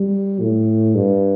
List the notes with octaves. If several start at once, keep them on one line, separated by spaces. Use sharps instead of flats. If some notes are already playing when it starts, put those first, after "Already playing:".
Already playing: G3
A2
G2